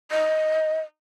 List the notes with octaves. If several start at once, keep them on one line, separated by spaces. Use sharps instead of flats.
D#5